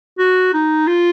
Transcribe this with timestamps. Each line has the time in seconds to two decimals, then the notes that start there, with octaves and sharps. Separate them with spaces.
0.19 F#4
0.54 D#4
0.87 F4